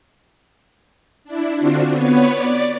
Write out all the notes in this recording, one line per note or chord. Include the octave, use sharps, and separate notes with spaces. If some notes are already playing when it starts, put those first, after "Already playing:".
D4 E4
D3 C4 D4 F4 F#4
B3 B4 C#5
D5